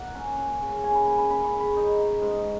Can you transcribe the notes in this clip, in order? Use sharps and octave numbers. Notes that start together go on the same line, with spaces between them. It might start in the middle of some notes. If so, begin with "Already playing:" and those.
Already playing: A#3 F#5
C#4
C#4
C#3
C#4 G#5
B5
A#3 G#5
B5
C#3 B5
C#6
C#3
B5
D#4
D#4
G#2